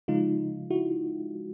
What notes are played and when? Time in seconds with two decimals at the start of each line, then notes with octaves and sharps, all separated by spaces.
0.08 C#3 F3 G#3 D#4 F4
0.70 E4 F#4